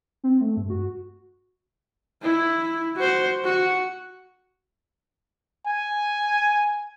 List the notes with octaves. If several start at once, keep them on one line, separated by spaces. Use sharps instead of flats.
C4
A3
G2
F#4
E4
F#4 C5
F#4
G#5